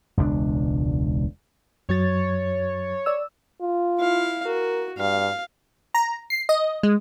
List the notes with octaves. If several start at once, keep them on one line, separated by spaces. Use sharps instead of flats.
E1 C#2 C#3 D4
F#2 F#3 C#5 A6
D5 E6
F4
E4 F5
F#4 A#4
G2 F5
A#5
C7
D#5
G#3